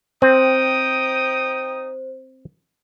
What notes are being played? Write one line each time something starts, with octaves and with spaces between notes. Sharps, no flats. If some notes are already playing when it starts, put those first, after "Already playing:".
C4 D#4 C5 G5 D#6